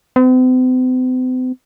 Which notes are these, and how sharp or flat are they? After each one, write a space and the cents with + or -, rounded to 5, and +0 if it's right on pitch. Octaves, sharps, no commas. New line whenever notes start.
C4 -45